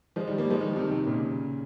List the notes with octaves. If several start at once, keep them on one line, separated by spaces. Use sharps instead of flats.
F3 G#3
D#3 G3
G3 A#3
F3 G#3
D#3 G3
C3 D#3
C3 D#3
A#2 C#3